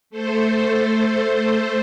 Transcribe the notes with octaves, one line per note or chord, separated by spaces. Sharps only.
A3 A4 C5